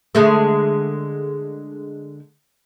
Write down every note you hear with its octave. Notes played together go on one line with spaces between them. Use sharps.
D3 G#3 A3